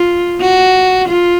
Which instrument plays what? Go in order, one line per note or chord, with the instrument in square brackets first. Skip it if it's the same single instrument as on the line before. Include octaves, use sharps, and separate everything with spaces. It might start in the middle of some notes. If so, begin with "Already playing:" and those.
Already playing: [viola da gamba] F4
F#4
F4